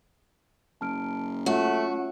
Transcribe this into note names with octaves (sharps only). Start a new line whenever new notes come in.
F#1 A5 F6 D7
A3 C#4 F4 F#4 C#5